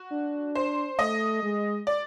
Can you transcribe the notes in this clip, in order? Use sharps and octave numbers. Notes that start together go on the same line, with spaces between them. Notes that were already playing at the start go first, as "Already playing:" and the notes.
Already playing: F#4
D4
C5
A3 D#5
G#3
D5